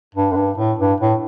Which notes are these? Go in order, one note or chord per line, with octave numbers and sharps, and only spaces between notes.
G2
F#2
G2
A2
G2
A2